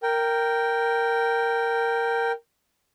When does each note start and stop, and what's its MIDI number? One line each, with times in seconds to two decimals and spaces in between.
0.03 2.32 70
0.03 2.32 79